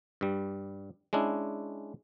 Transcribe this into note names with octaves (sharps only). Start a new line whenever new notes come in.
G2 G3
G#3 C#4 D4 E4